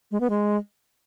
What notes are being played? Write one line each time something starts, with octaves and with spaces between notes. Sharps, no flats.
G#3
B3
G#3